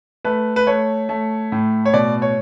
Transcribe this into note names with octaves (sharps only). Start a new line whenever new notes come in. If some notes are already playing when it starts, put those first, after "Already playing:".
A3 B4
B4
A3 C#5
A3
A2
C#5
B2 D5
C#5